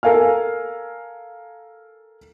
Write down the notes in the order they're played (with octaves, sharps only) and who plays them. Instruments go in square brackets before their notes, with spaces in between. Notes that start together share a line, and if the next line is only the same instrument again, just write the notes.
[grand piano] A4 A#4 F5 G#5 F6